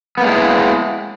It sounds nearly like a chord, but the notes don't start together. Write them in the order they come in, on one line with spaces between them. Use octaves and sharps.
B3 A#3 G#3 E4